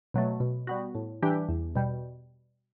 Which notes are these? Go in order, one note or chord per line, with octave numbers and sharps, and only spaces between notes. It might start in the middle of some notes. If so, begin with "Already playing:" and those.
B2 F#3 A3
B2
G3 B3 F#4
A2
E3 G3 D4 G4
E2
B2 G3